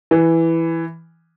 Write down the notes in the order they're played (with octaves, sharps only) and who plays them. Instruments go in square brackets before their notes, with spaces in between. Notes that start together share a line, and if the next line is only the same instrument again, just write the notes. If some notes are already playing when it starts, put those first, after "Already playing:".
[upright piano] E3